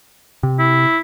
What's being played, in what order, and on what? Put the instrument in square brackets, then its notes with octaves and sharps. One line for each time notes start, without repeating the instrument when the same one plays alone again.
[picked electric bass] C3
[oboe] E4